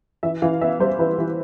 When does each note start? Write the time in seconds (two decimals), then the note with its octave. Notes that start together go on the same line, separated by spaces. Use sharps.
0.23 E3 E5
0.42 E3 F5
0.61 B3 E5
0.80 G3 C5
0.99 E3 B4
1.18 E3